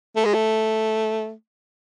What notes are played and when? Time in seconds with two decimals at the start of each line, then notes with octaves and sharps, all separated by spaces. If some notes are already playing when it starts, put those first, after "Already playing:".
0.16 A3
0.25 G#3
0.34 A3